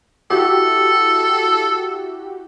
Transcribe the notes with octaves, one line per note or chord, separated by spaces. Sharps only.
E4 F#4 G4 A4